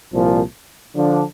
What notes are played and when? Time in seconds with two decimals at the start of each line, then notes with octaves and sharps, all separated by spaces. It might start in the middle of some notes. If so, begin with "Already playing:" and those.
0.13 C2 A#2 F3
0.94 D3 F3 D4